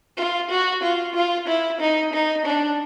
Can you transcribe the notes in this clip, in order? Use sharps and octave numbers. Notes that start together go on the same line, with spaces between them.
F4
F#4
F4
F4
E4
D#4
D#4
D4